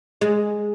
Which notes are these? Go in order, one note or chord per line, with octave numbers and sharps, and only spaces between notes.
G#3